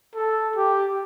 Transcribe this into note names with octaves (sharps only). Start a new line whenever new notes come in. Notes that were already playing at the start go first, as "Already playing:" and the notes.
A4
G4